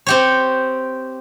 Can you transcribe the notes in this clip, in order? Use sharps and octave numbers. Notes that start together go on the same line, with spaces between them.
C4 G4 C#5